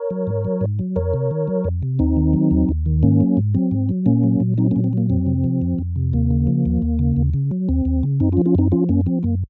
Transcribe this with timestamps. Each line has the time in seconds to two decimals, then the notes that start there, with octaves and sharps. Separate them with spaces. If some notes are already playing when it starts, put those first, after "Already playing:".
Already playing: A#4 C#5
0.11 F#3
0.27 G#2
0.45 F#3
0.61 G#2
0.79 F#3
0.96 F2 A#4 C#5
1.13 C3
1.31 D#3
1.48 F#3
1.64 F2
1.83 C3
1.99 D#2 C4 D#4
2.17 D#3
2.33 F#3
2.51 D#2
2.69 D#2
2.86 D#3
3.03 G#2 A#3 C#4
3.21 F#3
3.37 G#2
3.54 F#3 C4
3.71 G#2
3.89 F#3
4.06 A#2 A#3 C#4
4.24 F#3
4.40 A#2
4.58 F#3 C4 D#4
4.71 A#3 C#4
4.76 A#2
4.84 C4
4.93 F#3 A#3
5.10 F2 C4
5.26 C3
5.44 F3
5.62 F2
5.78 F2
5.96 C3
6.13 D#2 A#3
6.31 C#3
6.47 F3
6.66 D#2
6.82 D#2
6.99 C#3
7.17 D#2
7.34 C#3
7.51 F#3
7.69 D#2 C4
7.85 D#2
8.03 C#3
8.20 F#2 C4 D#4
8.32 C#4 F4
8.37 F3
8.46 C#4 F4
8.55 F#2 C4 D#4
8.72 F3 C#4 F4
8.89 F#2 A#3 C#4
9.06 F3 C4
9.23 F#2 A#3